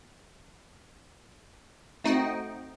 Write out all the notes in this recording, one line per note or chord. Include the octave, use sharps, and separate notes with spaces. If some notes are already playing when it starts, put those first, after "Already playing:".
A3 C4 D#4 F#4 D#5 G5